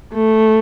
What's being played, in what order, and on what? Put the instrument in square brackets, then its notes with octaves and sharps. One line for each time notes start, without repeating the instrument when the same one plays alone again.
[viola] A3